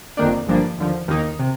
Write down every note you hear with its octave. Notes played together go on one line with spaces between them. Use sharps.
G1 F2 D#3 A#3 D4
G1 G2 F3 A#3 D4
D#2 D3 F3
D#2 D#3 A#3 D#4
C3